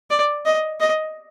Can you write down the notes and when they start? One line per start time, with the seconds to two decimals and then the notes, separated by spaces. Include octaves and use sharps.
0.10 D5
0.45 D#5
0.80 D#5